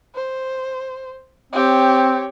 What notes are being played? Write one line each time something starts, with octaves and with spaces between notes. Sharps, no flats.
C5
C4 G4 C#5